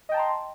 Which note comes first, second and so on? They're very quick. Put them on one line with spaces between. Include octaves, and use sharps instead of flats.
D#5 G5 A5 A#5 C6